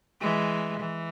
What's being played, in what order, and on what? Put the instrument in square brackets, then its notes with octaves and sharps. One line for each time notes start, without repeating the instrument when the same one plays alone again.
[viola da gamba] E3 G#3
E3